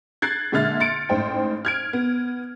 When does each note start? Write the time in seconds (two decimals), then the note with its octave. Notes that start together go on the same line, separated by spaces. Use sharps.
0.22 F#6 G#6 A6 C7
0.52 A#2 D3 G#3 E5 F6 A6
0.80 C6 A6 C#7 D7
1.09 A1 G#2 C5 G5
1.65 F6 G#6 D7
1.93 B3